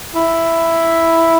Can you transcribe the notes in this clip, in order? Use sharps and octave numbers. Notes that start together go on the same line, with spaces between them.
E4